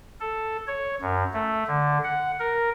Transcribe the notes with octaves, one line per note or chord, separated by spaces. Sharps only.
A4
C#5
F#2
A3
D3
F#5
A#4